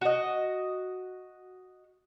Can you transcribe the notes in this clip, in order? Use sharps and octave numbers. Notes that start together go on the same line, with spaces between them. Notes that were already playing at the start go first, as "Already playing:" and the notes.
F#4 D#5